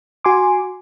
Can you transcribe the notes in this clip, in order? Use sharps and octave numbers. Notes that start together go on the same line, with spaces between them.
F#4 G#5 C6 D6